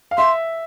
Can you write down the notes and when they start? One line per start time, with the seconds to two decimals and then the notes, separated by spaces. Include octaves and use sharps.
0.11 F5
0.17 E5 C6